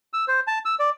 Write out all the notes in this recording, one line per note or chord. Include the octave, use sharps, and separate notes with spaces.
E6
C5
A5
E6
D5